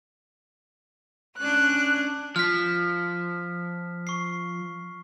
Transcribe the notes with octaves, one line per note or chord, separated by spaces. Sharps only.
C#4 D4 F#6
F3 F6 B6
C#6 C7